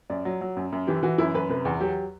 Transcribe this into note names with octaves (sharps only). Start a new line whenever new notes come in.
F#2 D5
F#3
F#3
F#2
F#2
E3 G4
E3 F#4
F#2 E4
F#2 B4
C3 B4
E2
F#3 G4